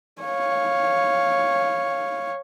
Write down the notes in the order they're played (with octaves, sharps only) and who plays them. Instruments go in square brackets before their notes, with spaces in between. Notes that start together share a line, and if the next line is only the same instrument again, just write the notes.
[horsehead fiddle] C#5 F5